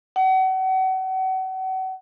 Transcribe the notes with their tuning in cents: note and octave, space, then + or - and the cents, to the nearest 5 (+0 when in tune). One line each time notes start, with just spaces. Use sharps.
F#5 +35